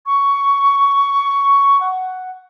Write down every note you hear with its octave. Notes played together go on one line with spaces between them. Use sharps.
C#6
F#5